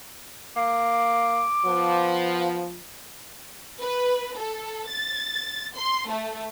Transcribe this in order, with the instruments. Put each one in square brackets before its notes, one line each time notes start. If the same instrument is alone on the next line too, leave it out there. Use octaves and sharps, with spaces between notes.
[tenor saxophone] A#3 [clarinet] D6
[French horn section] F3 [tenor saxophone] B3
[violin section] B4
A4
A6
C6
A3